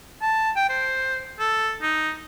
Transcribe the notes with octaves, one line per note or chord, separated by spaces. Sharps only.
A5
G5
C5
A4
D#4